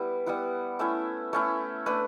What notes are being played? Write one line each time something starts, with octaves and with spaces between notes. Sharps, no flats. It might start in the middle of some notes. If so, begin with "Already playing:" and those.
Already playing: G3 B3 E4
G3 B3 E4 F#5
A3 C#4 E4 E5
A3 C#4 E4 C#5
A3 D4 B4